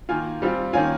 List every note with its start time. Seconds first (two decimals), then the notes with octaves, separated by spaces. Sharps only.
0.09 D#3 A#3 F4 G#5
0.42 G3 C4 F4
0.73 D#3 A#3 C#4 F4 G#5